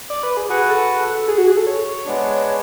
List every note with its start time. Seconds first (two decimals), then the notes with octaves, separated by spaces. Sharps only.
0.10 D5
0.23 B4
0.37 G#4
0.49 F#4 G#4 B4 F#5
0.70 A4
1.28 G#4
1.38 F#4
1.47 G#4
1.57 A4
1.67 C#5
2.06 G#3 B3 D4